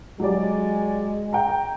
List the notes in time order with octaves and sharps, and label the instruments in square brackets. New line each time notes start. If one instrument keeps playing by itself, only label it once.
[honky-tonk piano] F#3 G4 D5 [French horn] G#3
[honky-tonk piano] G5 A#5